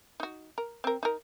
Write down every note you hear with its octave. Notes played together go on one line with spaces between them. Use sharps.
D#4 F#4
A#4
C4 A#4
D#4 A#4